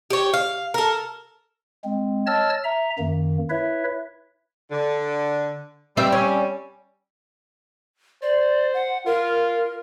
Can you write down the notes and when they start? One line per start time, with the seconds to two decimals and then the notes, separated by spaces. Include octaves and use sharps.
0.10 G4 C#5
0.34 F5
0.74 A4 A#4
1.84 G#3 C4
2.27 C#5 D#5 A5 E6 F6 A6
2.64 E5 A#5
2.99 F#2 D#3 A#3
3.50 E4 B4 C#5 E5
4.71 D3
5.97 G3 C4 C5 E5
6.12 C#4
8.22 C5 D5
8.74 F#5
9.06 F4 A#4